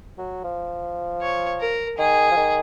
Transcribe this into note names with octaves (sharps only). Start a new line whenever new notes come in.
F#3
F3
C#5
A#4
D#3 G#4
F3
D#3